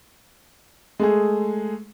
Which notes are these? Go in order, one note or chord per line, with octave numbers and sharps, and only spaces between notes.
G#3 A3 G#4